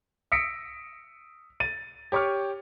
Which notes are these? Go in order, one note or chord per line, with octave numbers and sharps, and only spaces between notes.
D#6 E6 A#6 B6 C#7 D7
A6 D#7
G4 C#5 C#6 D6 F6